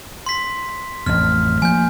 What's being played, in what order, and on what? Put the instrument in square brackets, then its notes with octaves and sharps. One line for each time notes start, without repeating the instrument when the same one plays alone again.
[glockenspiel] C6 B6
[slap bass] A1 F2 A2 [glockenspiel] F6
[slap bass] F3 A#3 [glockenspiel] G#5 G6